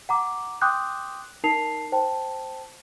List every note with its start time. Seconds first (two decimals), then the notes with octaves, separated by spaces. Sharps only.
0.09 F#5 A#5 D6
0.61 G5 C6 D6 D#6 F#6 G6
1.44 D#4 A#4 A5 C7 F7
1.92 C5 G5 A5